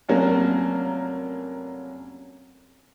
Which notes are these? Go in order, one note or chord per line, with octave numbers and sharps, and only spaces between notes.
F1 F#3 A#3 C#4